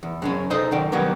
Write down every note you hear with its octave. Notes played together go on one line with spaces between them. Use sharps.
E2
F#2 C#3 C#4
D#4 A4 C5 D#5
F#2 D#3 D5
D#3 F#3 G3 A#3 B3